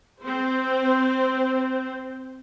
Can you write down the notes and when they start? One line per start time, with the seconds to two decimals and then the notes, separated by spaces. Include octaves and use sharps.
0.22 C4 C5